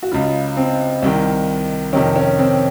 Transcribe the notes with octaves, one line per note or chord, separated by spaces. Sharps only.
F#4
C#2 C#3 F4
C4
C2 C3 D#3
F2 C3 D#3 C#4
C#4
C4